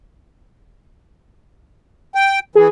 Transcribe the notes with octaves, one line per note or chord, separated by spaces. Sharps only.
G5
E3 G#4